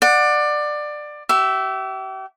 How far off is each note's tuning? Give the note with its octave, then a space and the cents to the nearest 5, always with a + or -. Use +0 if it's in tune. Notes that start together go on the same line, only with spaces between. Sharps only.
D5 +20 F#5 -15
G4 -40 E5 +0